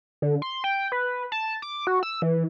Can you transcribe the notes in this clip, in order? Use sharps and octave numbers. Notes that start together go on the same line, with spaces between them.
D3
C6
G5
B4
A5
D6
F#4
E6
E3